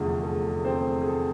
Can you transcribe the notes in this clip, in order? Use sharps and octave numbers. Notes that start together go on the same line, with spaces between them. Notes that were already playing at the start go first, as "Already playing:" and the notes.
Already playing: F1 E2 D3 F3 A3 G#4
A4
C4 C5
G#4
A4